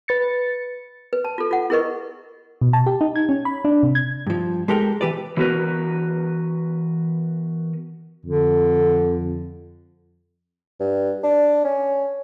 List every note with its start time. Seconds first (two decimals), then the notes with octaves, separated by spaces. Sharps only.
0.08 B4 A6 C#7
1.13 B4
1.25 A5
1.38 F4 A4
1.51 F4 F#5
1.70 E4 G#4 A#4 B4 D#5 C#6
2.62 B2
2.73 A5
2.86 G4
3.01 D#4
3.16 G#6
3.29 C#4
3.45 B5
3.65 D4
3.83 C3
3.95 G#6
4.27 G2 F3
4.68 G#3 G4 A4 A#4 G5
5.01 E3 G4 B4 D5
5.37 E3 F#3 B3 F#4 A#4 B4
8.25 F2 D3
10.81 G2
11.24 D4
11.65 C#4